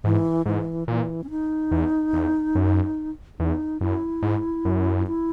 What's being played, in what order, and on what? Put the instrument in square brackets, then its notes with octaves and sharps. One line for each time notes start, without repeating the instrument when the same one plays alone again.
[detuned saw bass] G#2 [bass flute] E3
[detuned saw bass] G#2 [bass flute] E3
[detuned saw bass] A#2 [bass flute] E3
[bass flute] C#4
D#4
[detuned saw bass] E2
E2
F#2
[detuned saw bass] E2 [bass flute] D#4
[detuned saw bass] F#2 [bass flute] E4
[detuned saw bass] G#2
F#2
[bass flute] E4